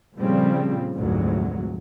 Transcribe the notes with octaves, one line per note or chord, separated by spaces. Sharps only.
F2 A#2 C#3 F3 G3 C4
F1 D2 G#2 F#3